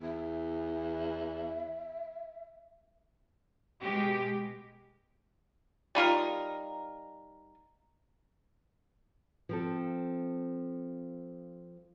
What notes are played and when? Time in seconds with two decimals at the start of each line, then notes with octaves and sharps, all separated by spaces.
0.01 E2 E5
3.81 B2 G#3 G4
5.95 G3 D#4 F4 A#4
9.49 F3 C4 A4